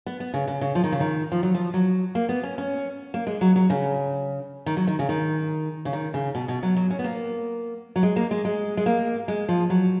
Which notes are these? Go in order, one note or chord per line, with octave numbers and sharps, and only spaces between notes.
B3
B3
C#3
C#3
C#3
F3
D#3
C#3
D#3
F3
F#3
F3
F#3
A#3
B3
C#4
C#4
A#3
G#3
F#3
F#3
C#3
D#3
F#3
D#3
C#3
D#3
C#3
D#3
C#3
B2
B2
F#3
F#3
C#4
B3
A#3
F#3
G#3
A#3
G#3
G#3
G#3
A#3
G#3
F3
F#3